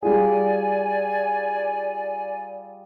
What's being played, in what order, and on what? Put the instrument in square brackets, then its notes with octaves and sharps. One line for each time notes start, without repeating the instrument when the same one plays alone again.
[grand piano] G3 F4 G#4 [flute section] D5 G#5